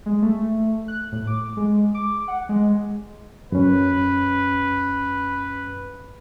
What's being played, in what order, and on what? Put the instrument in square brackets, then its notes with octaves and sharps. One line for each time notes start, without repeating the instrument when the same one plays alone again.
[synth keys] G#3
A3
F#6
A2
D6
G#3
D6
F#5
G#3
[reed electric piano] F#2 C#4 [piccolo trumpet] B4